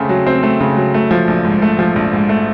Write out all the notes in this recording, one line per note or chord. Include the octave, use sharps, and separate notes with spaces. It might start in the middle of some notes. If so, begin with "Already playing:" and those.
Already playing: C#3 A3 C4
F#3
C4
A3
C#3
F#3
A3
F3
A#1
G#2
A3
F3
A#1
G#2
A3